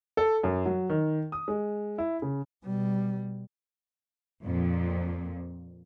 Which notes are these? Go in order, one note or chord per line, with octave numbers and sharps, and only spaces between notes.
A4
F#2
F#3
D#3
D#6
G#3
E4
C#3
B2 G3
F2 A#2 F3